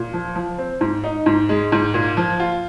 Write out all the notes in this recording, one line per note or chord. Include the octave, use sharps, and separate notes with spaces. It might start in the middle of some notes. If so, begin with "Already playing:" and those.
Already playing: A#2
F3
F3
C4
G#2
D#4
G#2
G#3
G#2
A#2
F3
F4